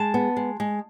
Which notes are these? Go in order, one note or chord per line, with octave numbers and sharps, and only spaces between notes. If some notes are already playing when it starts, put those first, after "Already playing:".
Already playing: G#3 A5
B3
G#3
G#3